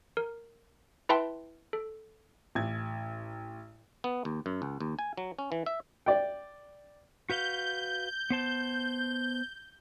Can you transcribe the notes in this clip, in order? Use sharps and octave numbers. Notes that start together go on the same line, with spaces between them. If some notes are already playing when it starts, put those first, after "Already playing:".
A#4
E4 B4 E5 G5 A5 C6
A4
A1 G#6
B3
D#2
F#2
C#2
D#2
G#5
F#3
C#4
E3
E5
D5 G5
F#4 B4 F5 G6
B3 C5 A5